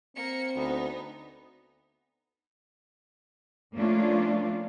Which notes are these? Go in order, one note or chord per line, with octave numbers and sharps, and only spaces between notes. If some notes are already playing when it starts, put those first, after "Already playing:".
A#3 C4 C#7
D2 B3 D#4
F3 A3 A#3 C#4 D4 F4